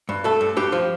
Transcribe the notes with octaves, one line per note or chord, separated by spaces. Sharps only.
G2
A3 A4
G2
G2 G4
F3